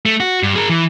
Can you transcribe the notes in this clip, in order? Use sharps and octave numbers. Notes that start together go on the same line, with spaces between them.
A3
F#4
G2
G#4 A#4
E3